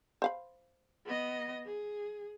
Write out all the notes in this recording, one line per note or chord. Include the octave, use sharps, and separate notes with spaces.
C5 F5 B5
B3 D#5
G#4